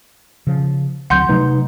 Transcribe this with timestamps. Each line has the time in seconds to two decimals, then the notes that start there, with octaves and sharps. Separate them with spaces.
0.47 C#3 F3
1.10 D2 F#3 C4 F#5 C6 G6
1.29 C3 F#3 A3 D#4 B4